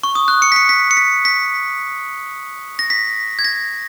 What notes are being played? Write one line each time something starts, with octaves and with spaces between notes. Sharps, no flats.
C#6
D#6
F#6
C#7
B6
C#7
B6
C#7
B6
B6
A#6
B6
G#6
A#6